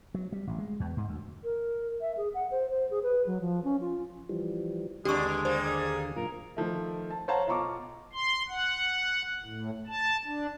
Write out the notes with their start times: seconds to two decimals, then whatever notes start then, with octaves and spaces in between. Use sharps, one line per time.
0.14 F#3
0.32 G3
0.47 A1
0.58 G#3
0.80 E2
0.97 G#2
1.08 D2
1.44 A#4
2.01 E5
2.17 G#4
2.34 F#5
2.51 C5
2.71 C5
2.91 G#4
3.03 B4
3.26 F#3
3.41 F3
3.64 C#4
3.81 F4
4.29 E3 F3 G3
5.05 D#2 B2 D3 G#3 B3 D4 G4 C#6
5.45 G3 A#3 C5
5.64 G#4
6.16 F#2 A#2 F4 A#4
6.57 D#3 F3 A3
7.10 A5
7.28 C5 C#5 F5 F#5 A5 A#5
7.47 B1 F4 A#5 C#6 D6
8.13 C6
8.49 F#5
9.44 A2
9.87 A5
10.25 D4